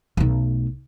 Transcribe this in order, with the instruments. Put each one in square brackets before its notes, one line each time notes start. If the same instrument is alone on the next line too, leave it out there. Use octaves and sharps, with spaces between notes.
[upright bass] B1 A3